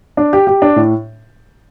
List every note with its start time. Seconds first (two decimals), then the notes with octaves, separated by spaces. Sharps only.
0.17 D4
0.33 G4
0.47 G4
0.62 D4
0.76 A2